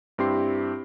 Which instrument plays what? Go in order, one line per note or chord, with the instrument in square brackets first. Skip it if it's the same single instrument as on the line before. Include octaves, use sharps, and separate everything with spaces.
[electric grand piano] G2 C4 E4 G4 C6 C7